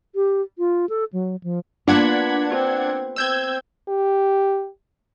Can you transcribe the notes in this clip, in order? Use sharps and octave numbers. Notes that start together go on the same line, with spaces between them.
G4
F4
A4
F#3
F3
A#3 B3 D4 F4 F#5 B5 G#6
C4
C4 E6 G6 G#6
G4